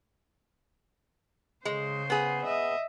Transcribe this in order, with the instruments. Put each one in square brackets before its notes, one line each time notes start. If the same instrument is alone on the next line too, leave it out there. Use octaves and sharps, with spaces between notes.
[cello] C#3 C5 [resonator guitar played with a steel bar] G#3
[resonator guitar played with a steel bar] B3 G#4
[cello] D#5 E5